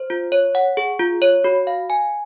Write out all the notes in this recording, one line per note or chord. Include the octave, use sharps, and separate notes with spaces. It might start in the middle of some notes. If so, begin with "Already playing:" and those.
Already playing: C5
F4
C#5
F#5
G#4
F4
C#5
F#4
F5
G#5